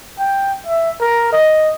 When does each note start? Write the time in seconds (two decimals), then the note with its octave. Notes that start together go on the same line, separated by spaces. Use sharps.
0.19 G5
0.67 E5
1.00 A#4
1.33 D#5